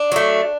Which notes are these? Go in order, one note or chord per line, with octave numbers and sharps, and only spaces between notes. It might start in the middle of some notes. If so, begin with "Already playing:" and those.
Already playing: D4
F#3 A3